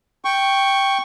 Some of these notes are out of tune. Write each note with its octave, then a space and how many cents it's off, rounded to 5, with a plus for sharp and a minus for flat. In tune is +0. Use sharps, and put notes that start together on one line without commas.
G5 +0 C#6 +0